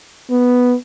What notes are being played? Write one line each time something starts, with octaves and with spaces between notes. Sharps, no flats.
B3